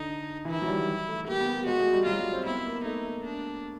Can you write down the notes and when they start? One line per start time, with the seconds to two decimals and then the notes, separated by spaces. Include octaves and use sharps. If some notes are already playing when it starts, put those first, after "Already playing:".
Already playing: D3 D#4
0.45 E3
0.49 D#3 E4
0.62 F#3
0.68 G3
1.09 A3
1.28 A#3 G4
1.40 B3
1.53 A#3
1.67 G#3 F#4
1.76 A3
1.80 G#3
1.93 G3
2.06 F#3 F4
2.19 G3
2.33 C4
2.46 B3 E4
2.66 A#3
2.85 A3 D#4
3.25 D4